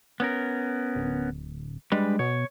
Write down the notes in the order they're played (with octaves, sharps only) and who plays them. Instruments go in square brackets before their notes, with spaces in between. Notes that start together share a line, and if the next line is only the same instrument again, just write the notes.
[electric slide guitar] B3 C#4 A#4
[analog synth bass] D1
[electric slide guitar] G3 D4 B4 [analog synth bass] G#3
[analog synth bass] B2 [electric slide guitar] C#5